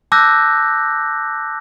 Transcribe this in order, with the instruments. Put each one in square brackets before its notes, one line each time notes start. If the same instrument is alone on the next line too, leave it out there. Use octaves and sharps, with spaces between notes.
[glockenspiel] A5 D6 E6 F#6 G6 A#6